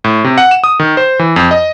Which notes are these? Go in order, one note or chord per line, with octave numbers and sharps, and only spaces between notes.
A2
C3
F#5
E7
D#6
D#3
C5
E3
F2
D#5